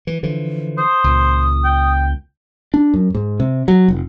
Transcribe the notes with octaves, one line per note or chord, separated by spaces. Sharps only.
E3
D3 E3 F3
C5 D#6
C#2 A#2
G5
D4
F#2
G#2
C3
F#3
F1